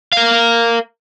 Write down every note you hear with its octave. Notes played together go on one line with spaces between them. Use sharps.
A#4 F5